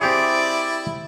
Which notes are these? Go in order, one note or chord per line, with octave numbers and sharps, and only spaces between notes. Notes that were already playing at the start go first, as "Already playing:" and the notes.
C4 E4 G4 G#4 D5